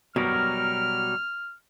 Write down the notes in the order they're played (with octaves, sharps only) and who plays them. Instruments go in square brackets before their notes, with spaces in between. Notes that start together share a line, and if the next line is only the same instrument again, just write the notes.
[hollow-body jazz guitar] B2 [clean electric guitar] F#3 G3 A#4 [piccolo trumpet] F6